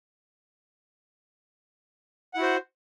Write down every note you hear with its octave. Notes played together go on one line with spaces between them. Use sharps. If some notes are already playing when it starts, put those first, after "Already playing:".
E4 F#4 C5 F#5